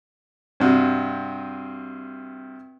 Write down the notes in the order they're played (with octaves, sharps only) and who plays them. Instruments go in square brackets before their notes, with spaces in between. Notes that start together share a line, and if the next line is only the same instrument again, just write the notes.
[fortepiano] G2 C3 F#4